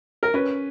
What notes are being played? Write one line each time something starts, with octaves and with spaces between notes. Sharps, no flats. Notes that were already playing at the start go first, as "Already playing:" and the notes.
A#4
C#4 B4